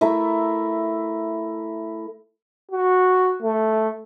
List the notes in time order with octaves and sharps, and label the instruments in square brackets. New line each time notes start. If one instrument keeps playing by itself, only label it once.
[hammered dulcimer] A3 E4 A#4 E5
[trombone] F#4
A3